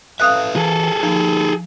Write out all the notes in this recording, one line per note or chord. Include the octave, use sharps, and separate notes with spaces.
A4 B4 E5 F5 D#6 F#6
E3 G#4 A4
F3 D#4 G4